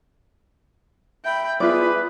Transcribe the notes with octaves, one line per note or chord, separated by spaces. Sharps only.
E5 G5 B5
B3 F4 G#4 B4 D5